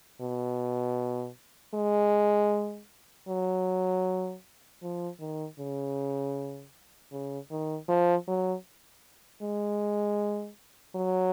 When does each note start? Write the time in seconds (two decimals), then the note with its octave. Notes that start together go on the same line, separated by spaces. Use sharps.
0.21 B2
1.74 G#3
3.28 F#3
4.82 F3
5.19 D#3
5.59 C#3
7.12 C#3
7.51 D#3
7.88 F3
8.27 F#3
9.42 G#3
10.96 F#3